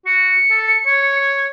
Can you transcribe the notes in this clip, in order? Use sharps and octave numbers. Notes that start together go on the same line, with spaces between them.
F#4 C#7
A4
C#5